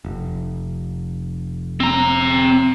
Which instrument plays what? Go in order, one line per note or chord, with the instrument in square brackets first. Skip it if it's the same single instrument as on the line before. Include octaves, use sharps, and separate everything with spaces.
[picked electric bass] F1
[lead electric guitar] C4 A#5